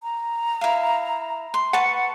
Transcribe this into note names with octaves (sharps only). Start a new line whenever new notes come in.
A#5
E4 F5
C6
B4 F#5 A5 C#6 C#7